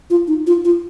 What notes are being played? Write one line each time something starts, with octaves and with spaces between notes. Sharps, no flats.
F4
D#4
F4
F4